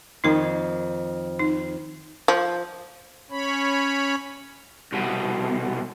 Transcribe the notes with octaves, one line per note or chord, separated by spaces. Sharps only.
F2 D#3 D#4 A#4
D#4
F3
C#4 C#5 B5
C2 B2